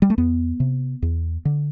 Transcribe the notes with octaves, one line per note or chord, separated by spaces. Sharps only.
G3
A3
E2 B3
C3
E2
D3